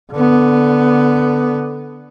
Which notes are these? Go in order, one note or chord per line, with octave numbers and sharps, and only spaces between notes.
D3 B3